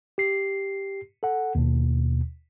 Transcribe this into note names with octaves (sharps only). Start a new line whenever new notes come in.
G4 C7
A4 F#5
D#2 B2